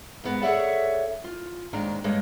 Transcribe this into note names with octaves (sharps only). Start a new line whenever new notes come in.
G#2 B3 A#4
G#4 A4 C#5 D5 E5 F#5
F4
D#2 G#2 D#3 D4 A#5
G2 G#3 A#3 C#5 D#5